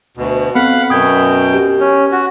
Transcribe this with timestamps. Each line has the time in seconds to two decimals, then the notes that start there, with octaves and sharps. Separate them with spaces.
0.17 D2 B2
0.55 B3 C4 A4 F5 F#5 B5
0.90 F#2 B2 G5 D#6 G#6
1.54 G4
1.80 C#4
2.12 F#4